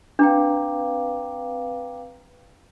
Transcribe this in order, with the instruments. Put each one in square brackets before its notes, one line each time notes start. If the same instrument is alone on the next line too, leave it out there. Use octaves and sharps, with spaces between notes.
[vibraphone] C4 B4 F5 [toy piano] D4 [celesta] G5 A#5 D6